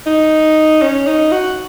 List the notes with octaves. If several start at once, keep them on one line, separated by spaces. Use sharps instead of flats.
D#4
C#4
D#4
F#4